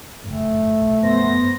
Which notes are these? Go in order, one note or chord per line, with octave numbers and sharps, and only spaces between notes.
F#1 F2 A2 A3
B1
F#2 B2 F3 B3 C5 A#6
G2